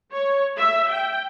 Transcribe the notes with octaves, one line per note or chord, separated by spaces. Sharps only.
C#5
E5
G5